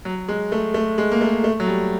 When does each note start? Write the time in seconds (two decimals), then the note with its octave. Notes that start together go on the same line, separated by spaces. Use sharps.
0.05 F#3
0.28 G#3
0.52 A3
0.74 A3
0.98 G#3
1.11 A#3
1.21 A3
1.44 A3
1.60 F#3
1.67 G3